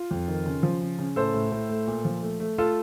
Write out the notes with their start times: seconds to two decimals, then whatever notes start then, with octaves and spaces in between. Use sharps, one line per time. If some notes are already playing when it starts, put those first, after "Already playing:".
Already playing: F4
0.11 F2
0.28 D#3
0.46 C#3
0.63 F3
0.81 C#3
0.99 C#3
1.16 A2 A4 C5
1.34 A2
1.52 A2
1.69 A3
1.87 A#2
2.05 F3
2.23 A3
2.40 A3
2.58 A3 F4 A4